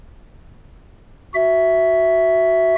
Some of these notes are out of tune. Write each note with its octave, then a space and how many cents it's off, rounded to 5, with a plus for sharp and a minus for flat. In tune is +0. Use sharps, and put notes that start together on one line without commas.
F#4 +10 E5 +0